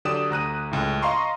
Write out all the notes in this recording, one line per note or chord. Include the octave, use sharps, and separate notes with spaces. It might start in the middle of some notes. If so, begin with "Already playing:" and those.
D3 F#3 G4 D5 D#6 E7
D2 A#5 F#6 D#7
C#2 A2
D#5 F5 A#5 C6 C#6